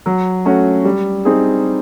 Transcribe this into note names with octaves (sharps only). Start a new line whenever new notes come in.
F#3
A3 C#4 F#4
G3
C4 D#4 G#4